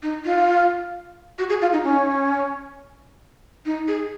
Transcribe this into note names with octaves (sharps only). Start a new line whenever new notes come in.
D#4
F4
F#4
G#4
F4
D#4
C#4
D#4
G#4